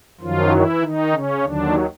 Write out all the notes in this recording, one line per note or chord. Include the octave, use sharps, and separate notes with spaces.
F#2 D#3 F3 F#3 F4
E3 E4
D#3 D#4
C#3 C#4
D#2 D3 D#3 F#3 D4